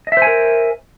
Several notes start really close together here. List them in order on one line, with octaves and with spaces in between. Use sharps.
D#5 E5 C5 G#5 A#4